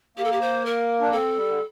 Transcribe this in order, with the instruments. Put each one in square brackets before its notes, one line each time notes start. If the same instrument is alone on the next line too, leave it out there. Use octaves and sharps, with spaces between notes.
[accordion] A#3 [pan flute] G4
[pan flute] A4
G4
C5
A#4
[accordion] D4
[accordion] C4 [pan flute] A4
[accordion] G3
D3